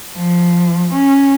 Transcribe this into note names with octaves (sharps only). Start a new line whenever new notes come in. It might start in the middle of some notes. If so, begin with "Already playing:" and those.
F3
C#4